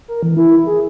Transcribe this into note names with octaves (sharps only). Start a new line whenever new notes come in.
A#4
E3
E4
G#4